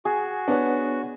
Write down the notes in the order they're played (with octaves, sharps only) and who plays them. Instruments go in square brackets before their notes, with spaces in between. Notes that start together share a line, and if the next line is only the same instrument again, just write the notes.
[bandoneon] F#4 [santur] G#4
[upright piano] B3 [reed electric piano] D4 C#5 F#5